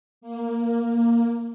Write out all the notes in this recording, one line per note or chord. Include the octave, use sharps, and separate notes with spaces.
A#3